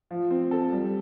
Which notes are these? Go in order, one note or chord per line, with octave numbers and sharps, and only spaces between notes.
F3
C4
A4
G3